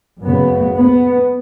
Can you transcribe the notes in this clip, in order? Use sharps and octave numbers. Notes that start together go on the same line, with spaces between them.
F#2 C#3 B3
B3